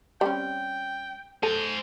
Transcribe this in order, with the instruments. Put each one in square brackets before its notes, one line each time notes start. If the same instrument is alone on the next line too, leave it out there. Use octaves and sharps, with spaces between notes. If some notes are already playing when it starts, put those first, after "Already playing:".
[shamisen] G3 C4 C#4 [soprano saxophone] G5
[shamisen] A4 [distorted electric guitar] C5 G#5